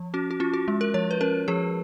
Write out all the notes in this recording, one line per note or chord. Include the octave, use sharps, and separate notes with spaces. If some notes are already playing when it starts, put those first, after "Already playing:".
Already playing: F3
C#4 F#4
F#4
C#4 F4
F#4
G#3
A#4
F3 C#5
B4
C#4 A#4
F3 G#4